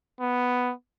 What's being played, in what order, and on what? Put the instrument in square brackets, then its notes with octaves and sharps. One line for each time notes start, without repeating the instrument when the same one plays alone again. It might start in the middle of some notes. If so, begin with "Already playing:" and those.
[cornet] B3